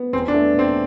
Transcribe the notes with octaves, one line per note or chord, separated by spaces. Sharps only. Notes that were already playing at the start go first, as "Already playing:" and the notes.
Already playing: B3
E2 C4
D4
A3
B2
C4